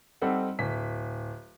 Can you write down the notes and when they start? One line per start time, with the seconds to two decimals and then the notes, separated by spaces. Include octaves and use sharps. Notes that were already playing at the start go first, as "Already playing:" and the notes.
0.22 G3 C4 D#4 A4 F#5
0.59 D1 B6